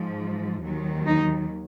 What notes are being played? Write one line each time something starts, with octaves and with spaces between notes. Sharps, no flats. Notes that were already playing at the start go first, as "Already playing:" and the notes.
Already playing: G#2 F3
D#2 D#3 F#3
D#4